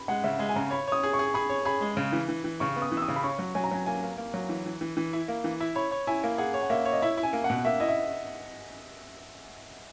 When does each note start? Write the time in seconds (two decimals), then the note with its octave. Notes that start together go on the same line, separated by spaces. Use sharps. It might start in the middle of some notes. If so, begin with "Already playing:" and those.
Already playing: B5
0.08 G#3 F#5
0.24 C#3 E5
0.39 G#3
0.49 G#5
0.56 C#3 A#5
0.71 C#5 B5
0.88 C#5 D#6
1.03 G#4
1.13 C#6
1.19 G#4
1.34 G#4 B5
1.49 C#5
1.65 G#4 B5
1.81 G#3
1.97 C#3
2.12 E3
2.29 E3
2.44 E3
2.60 C#3 C#6
2.76 B3
2.82 D#6
2.92 E3
2.97 E6
3.02 D#6
3.08 C#3
3.16 B5
3.24 C#4 C#6
3.39 F#3
3.55 F#3 G#5
3.64 A#5
3.71 F#3 G#5
3.86 A#3 G#5
4.03 A#3
4.17 A#3
4.34 F#3
4.49 E3
4.66 E3
4.81 E3
4.97 E3
5.13 E4
5.28 A#3
5.44 E3
5.61 E4
5.76 C#5 B5
5.91 C#5
6.07 E4 G#5
6.24 A#3
6.38 G#4 F#5
6.54 C#5
6.63 F#5
6.70 A#3 E5
6.85 C#5
6.92 D#5
7.02 E4 E5
7.18 E4
7.23 G#5
7.33 A#3
7.44 F#5
7.50 B2
7.65 A#3 E5
7.80 E4 D#5
7.89 E5